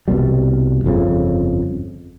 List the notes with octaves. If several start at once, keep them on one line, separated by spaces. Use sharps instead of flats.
C2 B2 G3
G1 F2 C#3